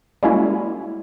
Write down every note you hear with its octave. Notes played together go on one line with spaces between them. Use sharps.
G3 G#3 A#3 C#4 E4 F#4